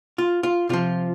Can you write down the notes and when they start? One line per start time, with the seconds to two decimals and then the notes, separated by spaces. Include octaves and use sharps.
0.18 F4
0.43 F4
0.69 C3 F3 F4